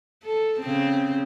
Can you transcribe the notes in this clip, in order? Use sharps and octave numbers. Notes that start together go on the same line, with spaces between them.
A4
C#3 C4